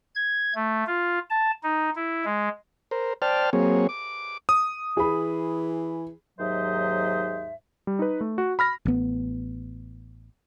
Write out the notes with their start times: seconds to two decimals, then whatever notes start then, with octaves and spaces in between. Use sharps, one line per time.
0.15 G#6
0.55 A3
0.87 F4
1.30 A5
1.63 D#4
1.96 E4
2.25 G#3
2.91 A#4 C5
3.22 C5 D5 G5 A5 F6
3.53 F#3 A#3 C4 G#4 C#5
3.89 D6
4.49 D#6
4.97 E3 G#4 B5
6.39 D#2 G#2 F#3 C5 D#5 E5
7.87 G3
7.99 D#4 B4
8.21 A3
8.38 F#4
8.59 B5 F6 A#6
8.86 A1 B3